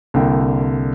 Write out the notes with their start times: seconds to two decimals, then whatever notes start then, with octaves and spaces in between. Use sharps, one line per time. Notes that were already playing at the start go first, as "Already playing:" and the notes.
0.14 C2 D3 A#3 G5